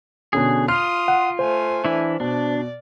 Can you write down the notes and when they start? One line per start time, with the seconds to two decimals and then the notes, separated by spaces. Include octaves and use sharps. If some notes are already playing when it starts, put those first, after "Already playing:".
0.33 B2 D3 C#4 G#4
0.68 F4 C6 D#6 F6
1.08 F#5
1.39 A3 C5 G#5
1.85 E3 D4 E4
2.20 B2 D4 D5